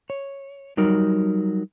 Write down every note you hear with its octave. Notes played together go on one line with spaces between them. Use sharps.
C#5
F#3 G3 D#4 A#4